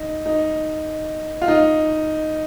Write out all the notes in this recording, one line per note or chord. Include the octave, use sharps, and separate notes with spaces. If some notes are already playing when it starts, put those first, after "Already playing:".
Already playing: D#4
D#4
F4
D#4